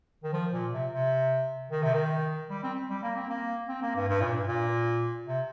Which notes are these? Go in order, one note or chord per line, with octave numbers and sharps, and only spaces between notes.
D#3
F3
A#2
C3
C3
D#3
C3
D#3
G3
C4
G3
A#3
C4
A#3
C4
A#3
G2
G2
A#2
G2
A#2
C3